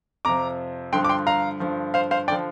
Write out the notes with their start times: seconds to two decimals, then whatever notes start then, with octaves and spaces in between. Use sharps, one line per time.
0.25 F2 C3 F3 A#5 D6
0.92 G2 D3 F3 G5 C6
1.05 D6
1.09 G5 C6
1.27 F5 A#5
1.60 G2 D3 F3
1.94 C5 F5
2.11 C5 F5
2.28 D3 F3 D5 G5